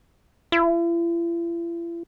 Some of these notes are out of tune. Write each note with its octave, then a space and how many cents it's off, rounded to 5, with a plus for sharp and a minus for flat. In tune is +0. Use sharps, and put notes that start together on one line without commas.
E4 +45